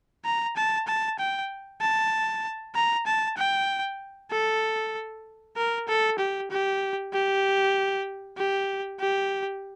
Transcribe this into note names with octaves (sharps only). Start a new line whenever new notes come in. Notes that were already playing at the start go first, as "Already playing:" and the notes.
A#5
A5
A5
G5
A5
A#5
A5
G5
A4
A#4
A4
G4
G4
G4
G4
G4